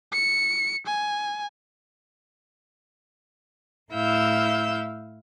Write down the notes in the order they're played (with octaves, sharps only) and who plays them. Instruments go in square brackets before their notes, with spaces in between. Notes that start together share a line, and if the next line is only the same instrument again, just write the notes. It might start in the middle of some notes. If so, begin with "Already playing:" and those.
[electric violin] C#7
G#5
[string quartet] A2 E4 F5 E6 G6